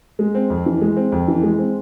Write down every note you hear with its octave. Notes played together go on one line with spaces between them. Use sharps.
G#3
C4
F2
E3
G#3
C4
F2
E3
G#3
C4